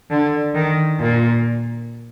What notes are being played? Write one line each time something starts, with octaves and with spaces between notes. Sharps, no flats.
D3
D#3
A#2